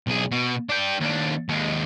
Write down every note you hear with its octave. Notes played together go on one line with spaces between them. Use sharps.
B1 G#4
B2
D4 G5
D#2 D4
D#2 G#3